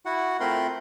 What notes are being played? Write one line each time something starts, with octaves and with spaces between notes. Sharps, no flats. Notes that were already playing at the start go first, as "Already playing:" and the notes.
E4 F#4 F#5
A3 C4 F4 A#4 B5 C6